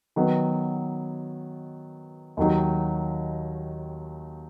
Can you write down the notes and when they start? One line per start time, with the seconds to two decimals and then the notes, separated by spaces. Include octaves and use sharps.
0.16 D#3 F#3 B3
2.37 D#2 D#3 F#3 D#4